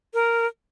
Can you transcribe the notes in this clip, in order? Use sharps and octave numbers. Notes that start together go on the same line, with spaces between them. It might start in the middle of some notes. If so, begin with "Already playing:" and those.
A#4